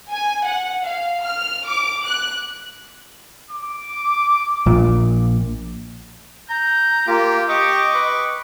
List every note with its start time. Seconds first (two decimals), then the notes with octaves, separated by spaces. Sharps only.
0.12 G#5
0.46 F#5
0.84 F5
1.23 F6
1.66 D6
2.05 F#6
3.51 D6
4.66 A#1 A#2
6.50 A#5 G6
7.07 A#3 F4 G4
7.49 G4 D#5 C#6 D6
7.95 B4